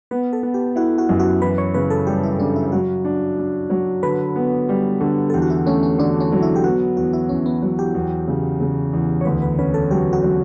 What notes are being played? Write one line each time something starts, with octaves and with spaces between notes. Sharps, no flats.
B3 B4
A4
B3
G4
E4 F#4
F#4
F#2
F#4
E3 B4
C#5
C#3 B4
A4
G3 G4
E4
C#3 D4
E4
F#3 F#4
D4
D4
F#3
D3 B4
B3
G3
D3
A4
E2 G4
F#4
E4
A3 C#4
C#4
D3 D4
C#4
F#3
E4
G4
B3 F#4
E2 F#4
E4
E2 C#4
B3
F#3
G4
E2
C#3
C#3
E2
C#5
D2 B4
B4
C#4 B4
A4
F#3 G4
F#4
F#3